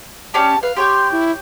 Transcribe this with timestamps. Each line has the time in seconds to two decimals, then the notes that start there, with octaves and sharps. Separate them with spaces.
0.34 C#4 D4 G4 A5
0.63 B4 F5
0.76 G4 C#5 G5 C6
1.12 E4